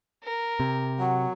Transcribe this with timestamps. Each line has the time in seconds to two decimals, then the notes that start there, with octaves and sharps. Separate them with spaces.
0.24 A#4
0.60 C3
0.99 F#3 F#5